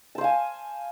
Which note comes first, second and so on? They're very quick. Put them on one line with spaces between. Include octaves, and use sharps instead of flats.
A5 C5 F5 G#5